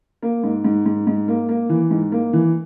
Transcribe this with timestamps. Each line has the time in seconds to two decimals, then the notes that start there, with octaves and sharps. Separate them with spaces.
0.23 A#3
0.43 G#2
0.64 G#2
0.86 G#2
1.07 G#2
1.28 A#3
1.49 A#3
1.69 E3
1.91 G#2
2.12 A#3
2.33 E3